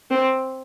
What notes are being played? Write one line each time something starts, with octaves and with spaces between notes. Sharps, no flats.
C4